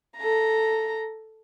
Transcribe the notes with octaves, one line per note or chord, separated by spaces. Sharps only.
A4 A#5